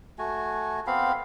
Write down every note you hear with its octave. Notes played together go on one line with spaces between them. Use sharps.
A3 F#4 G#5
B3 C4 F5 B5